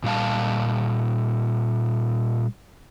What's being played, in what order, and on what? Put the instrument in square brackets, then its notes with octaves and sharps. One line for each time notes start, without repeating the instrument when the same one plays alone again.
[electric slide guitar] A#2 G3 F5 A5